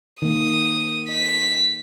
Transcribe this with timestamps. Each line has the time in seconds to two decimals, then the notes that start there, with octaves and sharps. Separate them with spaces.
0.22 D#3 A#3 D#6
1.09 D#5 B6